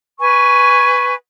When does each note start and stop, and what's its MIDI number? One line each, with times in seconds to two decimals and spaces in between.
0.19 1.14 71
0.19 1.14 80
0.19 1.14 85